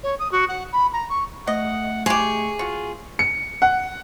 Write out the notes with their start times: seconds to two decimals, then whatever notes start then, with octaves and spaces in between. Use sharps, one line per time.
0.03 C#5
0.19 D#6
0.31 F#4
0.48 F#5
0.72 B5
0.92 A#5
1.09 C#6
1.47 A3 D#5 F#5
2.06 G#3 G4 G#4 C#6
2.59 F4 F#4
3.19 C#7
3.62 F#5